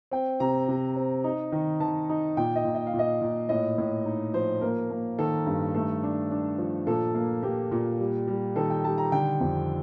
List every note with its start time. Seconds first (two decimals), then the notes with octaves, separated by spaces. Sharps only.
0.11 C4 G5
0.40 C3 A#5
0.68 C3
0.96 C4
1.24 D#4
1.52 D#3
1.80 D#3 A5
2.09 D#4
2.37 A#2 G5
2.56 D#5
2.65 A#2
2.75 D#5
2.87 F5
2.94 A#2
2.99 D#5
3.22 A#2
3.49 A2 D#5
3.78 A2
4.06 D#4
4.33 F3 C5
4.61 A#3 A#4
4.91 A#3
5.19 D#3 A4
5.46 G2
5.75 A3 A4
6.03 D4
6.31 D4
6.58 F3
6.87 A#2 A4
7.15 A#3
7.43 A#3 G4
7.71 A#2
7.99 G3
8.28 G3
8.56 D#3 A4
8.70 G5
8.84 G3 A5
8.98 A#5
9.12 D3 G5
9.40 F2